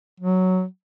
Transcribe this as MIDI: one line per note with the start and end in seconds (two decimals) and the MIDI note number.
0.20 0.64 54